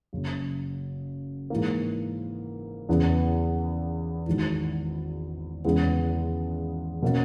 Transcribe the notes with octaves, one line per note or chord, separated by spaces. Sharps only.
F#1 F#2 C#3
G#2 E3 A#3
E2 C#3 E3 B3
G#1 G#2 E3
E2 C#3 E3 G#3 B3
B2 A#3 C#4